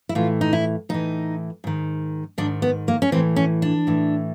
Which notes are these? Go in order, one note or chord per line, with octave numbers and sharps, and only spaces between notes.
E4
A2 E3 F4
D#4
E4
A2 E3 D#4
G#2 D#3
G#2 D#3 D4
B3
A#3
C#4
A2 E3 C4
C#4
D4
A2 E3